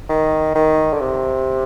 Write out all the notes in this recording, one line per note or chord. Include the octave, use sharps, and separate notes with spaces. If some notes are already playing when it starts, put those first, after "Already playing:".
D#3
D#3
D3
C3